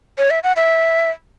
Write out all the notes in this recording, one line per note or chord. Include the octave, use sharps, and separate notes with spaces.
C#5
E5
F#5
E5